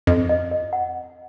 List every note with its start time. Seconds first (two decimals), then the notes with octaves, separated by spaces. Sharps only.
0.07 F2 D#5
0.29 D#5
0.51 D#5
0.73 F#5